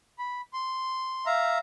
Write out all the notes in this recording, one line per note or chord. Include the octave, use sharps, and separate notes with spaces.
B5
C6
E5 F5 A#5